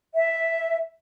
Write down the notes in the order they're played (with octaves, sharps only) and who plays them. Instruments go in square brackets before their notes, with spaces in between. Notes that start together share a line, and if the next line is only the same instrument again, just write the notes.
[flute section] E5